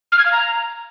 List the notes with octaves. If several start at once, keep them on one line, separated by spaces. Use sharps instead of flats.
F6
G#6
F5
A#5